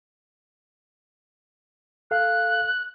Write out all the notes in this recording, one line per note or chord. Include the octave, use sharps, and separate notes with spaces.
A4 F5 F#6